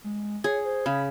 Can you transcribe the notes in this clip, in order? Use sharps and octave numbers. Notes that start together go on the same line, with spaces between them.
G#3
G#4 C#5
C5
C#3 B5